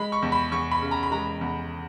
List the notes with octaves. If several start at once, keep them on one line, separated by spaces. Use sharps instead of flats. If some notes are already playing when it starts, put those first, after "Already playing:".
Already playing: G#3 B5
C#6
E2
B5
E2 C#6
B5
C#3
A#5
B5
G#3 A#5
E2